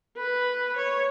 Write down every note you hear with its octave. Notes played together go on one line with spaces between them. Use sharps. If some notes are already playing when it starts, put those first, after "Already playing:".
B4
C#5